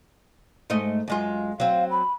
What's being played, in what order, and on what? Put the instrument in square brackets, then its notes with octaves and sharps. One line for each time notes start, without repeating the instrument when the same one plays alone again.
[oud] G#2 A3 D#5
F#2 G#3 F4
[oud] F#3 C4 [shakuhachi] F5
[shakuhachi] B5